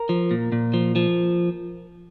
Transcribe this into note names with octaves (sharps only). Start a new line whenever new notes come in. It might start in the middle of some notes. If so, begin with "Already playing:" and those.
Already playing: A#4
F3
A#2
A#2
F3
F3